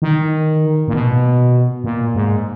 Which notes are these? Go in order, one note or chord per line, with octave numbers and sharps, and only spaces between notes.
D#3
A#2
B2
A#2
G#2